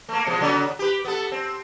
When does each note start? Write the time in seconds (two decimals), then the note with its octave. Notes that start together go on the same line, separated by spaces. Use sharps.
0.09 A3 A#3
0.27 B2 F3 G#3
0.41 C#3 F#3 B3
0.79 G4 B4
1.05 B3 A4
1.32 C4